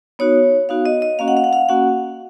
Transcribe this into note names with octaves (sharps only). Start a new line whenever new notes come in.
B3 D#4 F#4 C#5
B3 D#4 F#4 F5
D#5
D#5
A#3 C#4 F#4 F5
F#5
F5
F#5
F5
A#3 C#4 F#4 F#5